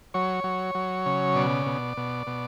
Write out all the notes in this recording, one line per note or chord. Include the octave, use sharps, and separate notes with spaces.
F#3 C#5
F#3
F#3
C#3
B2 D5
B2
B2
B2